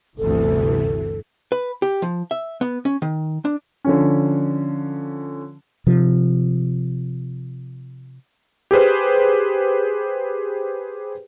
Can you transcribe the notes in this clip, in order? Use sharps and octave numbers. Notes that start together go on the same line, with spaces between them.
G1 D2 C3 E3 A4
B4
G4
F3
E5
B3
C#4
D#3
D4
D3 F3 C#4
C3 F3
G4 G#4 B4 C5